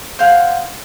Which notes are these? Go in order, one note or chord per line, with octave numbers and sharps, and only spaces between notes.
C5 F5 F#5 G#5